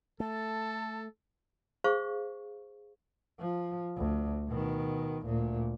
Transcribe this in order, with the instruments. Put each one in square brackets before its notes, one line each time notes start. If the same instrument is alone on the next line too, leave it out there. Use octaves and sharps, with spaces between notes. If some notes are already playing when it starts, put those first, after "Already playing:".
[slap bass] A3 [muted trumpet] A4 [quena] A5
[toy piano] G#4 C5 F5 C#6
[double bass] F3
D2
B2 D#3
D2 A#2